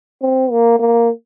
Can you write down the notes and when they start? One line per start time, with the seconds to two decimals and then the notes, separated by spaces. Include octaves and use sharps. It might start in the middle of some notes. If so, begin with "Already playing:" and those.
0.22 C4
0.51 A#3
0.79 A#3